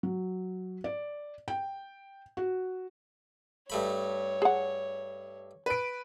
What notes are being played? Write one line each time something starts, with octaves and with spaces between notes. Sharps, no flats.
F#3
D5
G5
F#4
G2 A3 C#5 B5
G#4 F#5
B4 D7